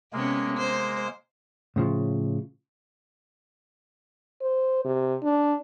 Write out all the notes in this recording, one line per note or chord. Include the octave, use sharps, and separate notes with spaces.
C3 G#3 A#3 B3 C#4
C5
A2 C#3 F3
C5
C3
D4